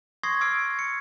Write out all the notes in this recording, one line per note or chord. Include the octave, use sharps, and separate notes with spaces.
C6 C#6 D#6 G#6 A#6 C7
D6 E6 F6 G#6 C7 D7
C#7